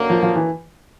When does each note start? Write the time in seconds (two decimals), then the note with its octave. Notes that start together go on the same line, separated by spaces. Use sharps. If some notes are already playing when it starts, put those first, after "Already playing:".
Already playing: F#2 D3 F#3 A#3
0.10 F3
0.23 F3
0.36 E3